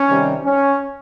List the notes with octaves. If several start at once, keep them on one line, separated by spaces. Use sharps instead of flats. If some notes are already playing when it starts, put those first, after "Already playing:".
Already playing: C#4
C3 D#3 G3
C#4